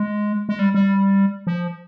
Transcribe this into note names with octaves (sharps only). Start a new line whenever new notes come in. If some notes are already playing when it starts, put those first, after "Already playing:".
Already playing: G#3
G#3
G3
G3
F3